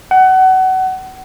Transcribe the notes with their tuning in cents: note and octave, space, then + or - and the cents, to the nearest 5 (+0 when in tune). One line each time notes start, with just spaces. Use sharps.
F#5 +25